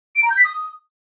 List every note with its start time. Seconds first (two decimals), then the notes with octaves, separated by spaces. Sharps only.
0.15 D7
0.23 A#5
0.30 G6
0.37 B6
0.45 D#6